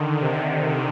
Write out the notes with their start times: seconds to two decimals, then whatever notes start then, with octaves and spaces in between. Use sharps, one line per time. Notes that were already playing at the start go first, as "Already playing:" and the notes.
Already playing: D3 D#3
0.20 C3